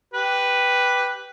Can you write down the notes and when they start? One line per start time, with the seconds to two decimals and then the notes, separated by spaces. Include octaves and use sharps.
0.14 G4 B4